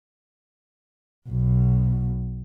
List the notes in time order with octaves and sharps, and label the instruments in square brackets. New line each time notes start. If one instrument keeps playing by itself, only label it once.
[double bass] B1 B2